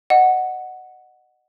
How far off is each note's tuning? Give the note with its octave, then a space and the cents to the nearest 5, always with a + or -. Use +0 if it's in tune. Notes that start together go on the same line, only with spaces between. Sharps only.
D#5 -25 F#5 +0